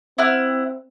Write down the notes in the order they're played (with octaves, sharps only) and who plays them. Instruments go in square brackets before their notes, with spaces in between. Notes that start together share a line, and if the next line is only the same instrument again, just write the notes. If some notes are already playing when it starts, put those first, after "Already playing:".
[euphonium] C4 [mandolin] E4 F#5 F6